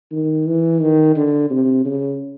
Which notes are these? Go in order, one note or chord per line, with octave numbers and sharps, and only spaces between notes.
D#3
E3
D#3
D3
C3
C#3